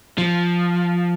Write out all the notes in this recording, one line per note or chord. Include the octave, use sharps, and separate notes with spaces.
F3